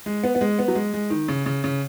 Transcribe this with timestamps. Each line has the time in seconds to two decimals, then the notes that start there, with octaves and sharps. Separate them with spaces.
0.06 G#3
0.23 B3
0.35 B3
0.41 G#3
0.59 B3
0.68 F#3
0.75 G#3
0.94 G#3
1.10 D#3
1.28 C#3
1.46 C#3
1.64 C#3